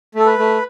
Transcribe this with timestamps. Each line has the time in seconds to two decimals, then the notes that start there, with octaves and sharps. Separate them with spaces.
0.15 A3 A4
0.26 B4
0.38 A3